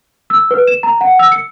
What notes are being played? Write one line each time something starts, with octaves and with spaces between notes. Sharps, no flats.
E6
B4
E7
A#5
F#5
E6
C#7